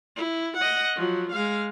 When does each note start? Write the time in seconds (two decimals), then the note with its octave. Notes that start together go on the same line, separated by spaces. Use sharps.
0.16 E4
0.57 D#5 F#5
0.96 F3 F#3
1.32 G#3 F5